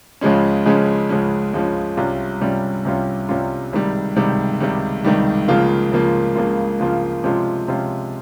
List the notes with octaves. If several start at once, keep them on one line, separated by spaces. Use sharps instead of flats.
C#2 C#3 F3 G#3 C#4
C#2 C#3 F3 G#3 C#4
C#2 C#3 F3 G#3 C#4
C#2 C#3 F3 G#3 C#4
C2 C3 G3 C#4 F4
C2 C3 G3 C#4 F4
C2 C3 G3 C#4 F4
C2 C3 G3 C#4 F4
C#2 C3 D#3 G3
C#2 C3 D#3 G3
C#2 C3 D#3 G3
C#2 C3 D#3 G3
C#2 C#3 F3 A#3 F4
C#2 C#3 F3 A#3 F4
C#2 C#3 F3 A#3 F4
C#2 C#3 F3 A#3 F4
C3 F3 G#3 C#4 F4
C3 F3 G#3 C#4 F4